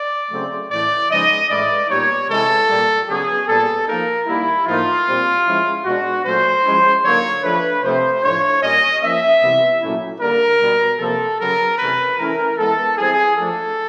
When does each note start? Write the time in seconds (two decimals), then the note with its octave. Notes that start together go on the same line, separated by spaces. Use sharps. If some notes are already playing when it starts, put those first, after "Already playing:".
Already playing: D5
0.31 C#3 F#3 A3 C4
0.70 A2 E3 A3 D5
1.10 C#3 F3 G#3 B3 D#4 D#5
1.50 A2 E3 G#3 C#4 E4 D5
1.89 A#2 G3 B3 D#4 C#5
2.29 C3 E3 G#3 C#4 E4 A4
2.68 A#2 G3 A#3
3.08 C#3 F#3 B3 D4 G#4
3.48 A#2 G3 B3 A4
3.87 F3 A#3 D#4 A#4
4.27 D#3 G3 A#3 E4
4.66 A2 F3 A#3 D#4 F4
5.06 A#2 G3 C4
5.46 F3 G#3 C#4 E4
5.85 B2 G#3 B3 D4 F#4
6.25 A#2 F#3 A3 C#4 C5
6.64 F3 G#3 C#4 E4
7.04 D3 F#3 A#3 D#4 C#5
7.43 F3 A3 D4 B4
7.83 C3 F3 A3 C4 C5
8.22 A2 F3 A3 D4 C#5
8.62 A#2 G3 A#3 C#4 D#5
9.02 F3 A#3 C#4 E5
9.41 C3 E3 G3 B3
9.81 A#2 F#3 A3 C#4 E4
10.21 D3 G3 A#3 D4 A#4
10.60 B2 G3 B3
11.00 C3 F3 A#3 A4
11.39 C#3 F#3 B3 A#4
11.79 C3 E3 A3 C#4 B4
12.18 E3 A3 C#4 E4 A#4
12.58 E3 G#3 B3 A4
12.98 E3 G3 C4 G#4
13.37 F3 A3 D4 A4